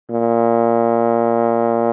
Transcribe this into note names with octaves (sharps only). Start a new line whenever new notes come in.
A#2